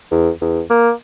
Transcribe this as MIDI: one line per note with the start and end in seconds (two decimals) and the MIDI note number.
0.12 0.30 40
0.41 0.61 40
0.70 0.91 58